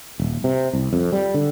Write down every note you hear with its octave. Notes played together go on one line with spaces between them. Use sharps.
D#1
C3
C2
F2
G3
D3